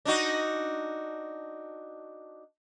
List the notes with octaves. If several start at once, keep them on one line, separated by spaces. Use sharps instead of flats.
D4 D#4 F#4